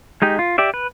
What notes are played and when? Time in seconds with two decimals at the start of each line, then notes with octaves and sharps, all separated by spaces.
0.22 G#3 D#4 G4
0.39 F4
0.58 G4 D5 E5
0.74 B4